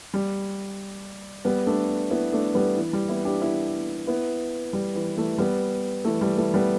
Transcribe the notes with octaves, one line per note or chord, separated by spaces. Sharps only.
G3
G3 B3
A3 D4
B3 E4
A3 D4
G3 B3
E3
G3
B3 E4
D4 G4
B3 E4
B3 E4
G3
E3
E3 A3
G3 B3
E3 A3
G3
E3 A3
G3 B3